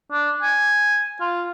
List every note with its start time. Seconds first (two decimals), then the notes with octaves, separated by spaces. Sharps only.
0.12 D4
0.42 G#5
1.20 F4